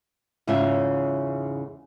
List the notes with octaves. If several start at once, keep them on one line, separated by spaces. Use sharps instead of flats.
E2 G#2 C#3 C#4 F4 E5